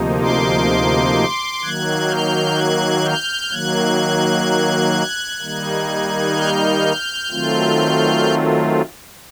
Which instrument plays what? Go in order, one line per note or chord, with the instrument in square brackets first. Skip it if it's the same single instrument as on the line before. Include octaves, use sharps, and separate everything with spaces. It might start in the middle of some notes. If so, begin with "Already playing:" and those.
Already playing: [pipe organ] D2 C3 F3 A#3 D#4
C6 D6
D#3 F#3 A#3 F#6 G#6
F6 G6
F#6 G#6
F6 G6
D#3 F#3 A#3 F#6 G#6
D#3 G3 A#3 D#4
F6 G6
D#3 F#3 A3 C4 F4